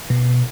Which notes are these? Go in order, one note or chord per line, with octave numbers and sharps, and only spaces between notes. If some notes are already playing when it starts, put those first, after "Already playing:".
B2